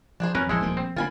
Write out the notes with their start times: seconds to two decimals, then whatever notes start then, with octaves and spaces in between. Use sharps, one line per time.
0.20 F3 D4 G#4 C5
0.35 F2 F#3 C#4 A#4 B4
0.49 A#1 F3 G#3 E4 G#4 A4 C5
0.61 D#1 D2 A#3
0.77 C4
0.96 D3 A#3 F4 G#5 B5